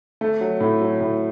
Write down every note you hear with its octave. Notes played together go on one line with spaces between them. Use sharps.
A3
F#3
A2
F#3
A2